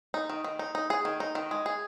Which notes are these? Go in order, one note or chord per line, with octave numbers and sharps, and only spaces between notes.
D#4
D#3
D#3
D#4
D#4
G#4
D#3
D#4
D#3
G#3
G#4